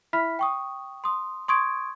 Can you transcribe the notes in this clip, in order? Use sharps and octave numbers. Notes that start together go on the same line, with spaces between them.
E4 E5 B5 F6 B6
G5 C#6 D#6
C6 D#6
C6 C#6 D#6 G#6 D7